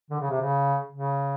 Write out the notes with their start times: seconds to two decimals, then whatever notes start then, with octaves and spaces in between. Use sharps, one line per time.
0.10 D3
0.20 C#3
0.30 C3
0.41 C#3
0.92 C#3